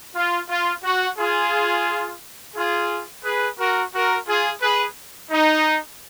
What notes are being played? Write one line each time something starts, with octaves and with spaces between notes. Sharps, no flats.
F4
F4
F#4
F4 G#4
F4 G#4
G#4 B4
F#4 A#4
F#4 A#4
F4 G#4
G#4 B4
D#4